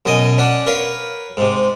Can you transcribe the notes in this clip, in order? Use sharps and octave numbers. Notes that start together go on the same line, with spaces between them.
F#2 B2 D#5 G#5
C#4 D4 F#5
A#4 B4 C#5 F5
G#2 C3